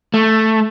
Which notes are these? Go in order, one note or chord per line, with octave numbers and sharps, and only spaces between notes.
A3